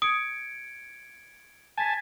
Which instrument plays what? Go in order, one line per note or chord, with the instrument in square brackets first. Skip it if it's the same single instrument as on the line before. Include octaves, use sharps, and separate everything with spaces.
[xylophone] D#6 [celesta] G#6 C#7 D7
[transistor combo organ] G#5 A5 [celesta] G#6 A6 B6